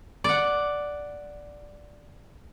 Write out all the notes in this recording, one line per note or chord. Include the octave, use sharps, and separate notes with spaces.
D5 F#5